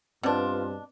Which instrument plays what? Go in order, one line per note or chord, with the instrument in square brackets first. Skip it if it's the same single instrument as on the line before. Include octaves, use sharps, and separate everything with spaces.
[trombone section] G2 [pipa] B2 D4 [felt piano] C4 B4 [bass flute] F4